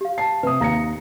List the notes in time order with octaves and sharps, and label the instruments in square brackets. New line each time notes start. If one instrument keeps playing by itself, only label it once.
[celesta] G4 F5
[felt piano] A5 C7
[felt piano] C3 D#6 [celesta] B4
[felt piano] D#2 A#6 C#7 [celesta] F5 A#5